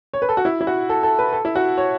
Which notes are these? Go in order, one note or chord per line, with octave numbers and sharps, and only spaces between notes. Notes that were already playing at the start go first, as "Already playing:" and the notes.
C#5
B4
A4
F#4
E4
E4
F#4
A4
A4
B4
A4
E4
F#4
C#5